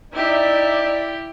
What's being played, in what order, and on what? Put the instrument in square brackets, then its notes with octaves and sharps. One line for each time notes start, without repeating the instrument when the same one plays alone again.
[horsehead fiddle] D#4 E5 [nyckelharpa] E4 G4 [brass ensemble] D5